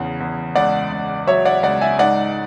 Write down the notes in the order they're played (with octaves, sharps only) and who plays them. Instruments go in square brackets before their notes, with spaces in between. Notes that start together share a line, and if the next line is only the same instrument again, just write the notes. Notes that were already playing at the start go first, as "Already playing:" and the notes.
Already playing: [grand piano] E2 C#3
E2
C#2 D5 F#5
C#2
F#3 C#5 E5
D5 F#5
C#2 D5 F#5
E5 G#5
G#2 D5 F#5